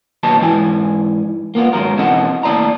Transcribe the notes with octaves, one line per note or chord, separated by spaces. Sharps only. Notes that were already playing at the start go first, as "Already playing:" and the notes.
D#2 B2 F#3 B4 D#5 A5
G#2 E3 E4 G#5
A#3 B3 F4
G#2 D#3 F#3 A#4
B2 E3 C4 A4 D#5 F#5
D#2 A2 D5 A5 A#5